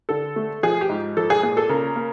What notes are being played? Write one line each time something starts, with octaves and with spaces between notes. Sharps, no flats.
D3 A4
A3
F3 G#4
G4
G#2
F3 A4
G#4
A#2 G#4
A4
C#3 A#4
A#3